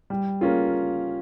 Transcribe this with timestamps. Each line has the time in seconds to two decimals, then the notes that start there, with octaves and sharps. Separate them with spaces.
0.10 G3
0.41 A#3 C#4 F4 G#4